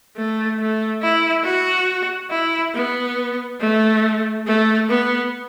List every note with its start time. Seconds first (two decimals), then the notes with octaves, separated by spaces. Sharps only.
0.16 A3
0.59 A3
1.02 E4
1.44 F#4
2.31 E4
2.74 B3
3.60 A3
4.46 A3
4.89 B3